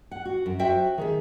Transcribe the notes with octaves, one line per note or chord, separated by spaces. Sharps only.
F#5
F#4
F#2
F#4 C5 E5 G5
D#3 G#4 E5